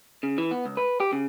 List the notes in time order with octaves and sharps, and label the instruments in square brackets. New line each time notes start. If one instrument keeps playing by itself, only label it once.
[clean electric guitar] C#3
E3
B3
C#2
B4
G4
C#3